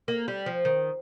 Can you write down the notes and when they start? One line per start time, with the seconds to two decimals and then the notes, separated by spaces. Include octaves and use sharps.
0.08 A#3
0.28 G3
0.46 F3
0.65 D#3